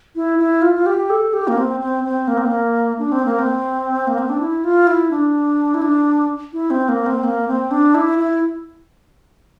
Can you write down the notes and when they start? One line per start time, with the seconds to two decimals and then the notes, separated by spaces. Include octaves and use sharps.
0.16 E4
0.39 E4
0.62 F4
0.75 F4
0.86 G4
1.10 A4
1.33 G4
1.48 A#3
1.58 C4
1.80 C4
2.04 C4
2.28 A#3
2.38 C4
2.46 A#3
2.99 D4
3.12 C4
3.25 A#3
3.39 C4
4.07 A#3
4.18 C4
4.29 D4
4.40 E4
4.64 F4
4.87 E4
5.11 D4
5.74 E4
5.82 D4
6.53 E4
6.70 C4
6.89 A#3
7.06 C4
7.24 A#3
7.48 C4
7.71 D4
7.95 E4
8.18 E4